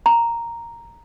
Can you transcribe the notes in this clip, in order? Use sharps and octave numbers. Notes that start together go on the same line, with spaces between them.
A#5